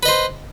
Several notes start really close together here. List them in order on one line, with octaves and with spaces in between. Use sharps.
B4 D#5 C5